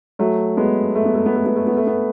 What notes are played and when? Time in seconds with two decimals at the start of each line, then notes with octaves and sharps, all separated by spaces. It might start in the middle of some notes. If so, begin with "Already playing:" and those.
0.19 F#3 A3
0.57 G#3 B3
0.95 A3
1.05 B3
1.15 A3
1.26 B3
1.36 A3
1.46 B3
1.56 A3
1.67 B3
1.77 A3
1.87 B3